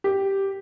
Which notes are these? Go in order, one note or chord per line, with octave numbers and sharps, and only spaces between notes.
G4